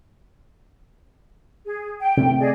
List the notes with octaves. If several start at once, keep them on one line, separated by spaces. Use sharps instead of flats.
G#4
G5
C3 A3
G#4 D5 D#5